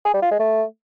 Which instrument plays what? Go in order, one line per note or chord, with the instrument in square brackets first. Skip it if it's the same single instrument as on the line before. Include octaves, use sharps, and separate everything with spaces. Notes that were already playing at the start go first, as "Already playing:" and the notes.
[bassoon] G#4
G3
F4
G#3
A3